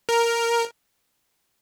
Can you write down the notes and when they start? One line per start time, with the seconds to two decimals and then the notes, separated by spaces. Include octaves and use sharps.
0.09 A#4